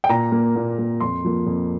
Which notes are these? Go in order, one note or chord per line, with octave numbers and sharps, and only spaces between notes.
G5
A#2 A#5
A#3
A#2
A#3
F2 C6
F3 A#3
F2